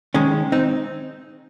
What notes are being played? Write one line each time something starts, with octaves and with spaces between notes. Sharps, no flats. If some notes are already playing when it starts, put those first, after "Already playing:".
D#3 G#3 C#4
C4 D#4